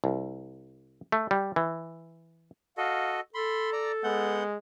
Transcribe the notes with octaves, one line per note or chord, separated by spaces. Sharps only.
C2
A3
G3
E3
F#4 A4 D#5 F5
A4 B5 C6
D5 A#5
G#3 B3 F#5 G6